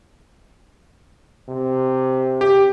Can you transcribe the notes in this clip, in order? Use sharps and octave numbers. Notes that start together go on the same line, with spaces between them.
C3
G4